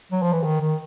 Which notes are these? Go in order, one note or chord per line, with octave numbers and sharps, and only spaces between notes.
F#3
F3
E3
D#3
D#3